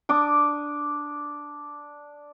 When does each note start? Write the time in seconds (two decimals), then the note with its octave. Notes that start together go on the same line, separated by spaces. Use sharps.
0.09 D4 D6 D#6